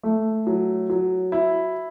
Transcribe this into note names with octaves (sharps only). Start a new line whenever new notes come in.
A3
F#3
F#3
E4